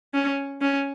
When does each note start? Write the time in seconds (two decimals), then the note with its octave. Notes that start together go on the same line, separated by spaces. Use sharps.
0.14 C#4
0.61 C#4